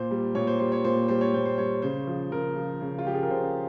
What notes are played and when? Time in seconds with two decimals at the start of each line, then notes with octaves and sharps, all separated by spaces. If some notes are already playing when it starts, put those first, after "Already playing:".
Already playing: A#2 C5
0.11 G3
0.35 A#2 C#5
0.47 C5
0.59 G3 C5
0.72 C#5
0.84 A#2 C5
1.08 G3 C5
1.21 C#5
1.34 A#2 C5
1.46 C5
1.58 G3 C#5
1.82 C#3 C5
2.07 F3
2.31 C#3 A#4
2.56 F3
2.81 C#3
2.99 F4
3.05 F3 G4
3.14 G#4
3.23 A#4
3.30 C#3 C5